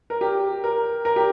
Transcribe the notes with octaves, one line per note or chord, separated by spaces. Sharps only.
A#4
G4
A#4
A#4
G4